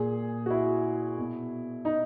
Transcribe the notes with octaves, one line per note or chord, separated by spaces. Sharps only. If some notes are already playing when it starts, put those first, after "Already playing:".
Already playing: A#2 G#4
F#4
E4
B2
D#4